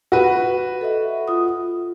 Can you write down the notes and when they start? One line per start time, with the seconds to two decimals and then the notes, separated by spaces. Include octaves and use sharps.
0.12 F#4 B4
0.81 A4 D#5 E5
1.28 F4 D#6